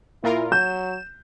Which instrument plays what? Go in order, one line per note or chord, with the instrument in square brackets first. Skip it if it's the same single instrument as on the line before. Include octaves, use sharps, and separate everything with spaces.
[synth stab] A#2 F4 A#4 [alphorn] E4
[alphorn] F#3 [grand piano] G6 [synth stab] E7